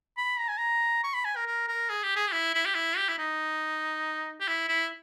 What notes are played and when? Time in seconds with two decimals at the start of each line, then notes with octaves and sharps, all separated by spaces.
0.17 B5
0.39 A#5
0.48 G#5
0.58 A#5
1.03 C#6
1.14 B5
1.25 G#5
1.36 A#4
1.47 A#4
1.68 A#4
1.89 G#4
2.03 G4
2.16 G#4
2.27 G4
2.32 E4
2.54 E4
2.66 G4
2.75 E4
2.97 G4
3.09 E4
3.18 D#4
4.40 G4
4.48 E4
4.68 E4